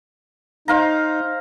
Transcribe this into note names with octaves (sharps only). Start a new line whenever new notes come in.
D#4 C5 F5 A#5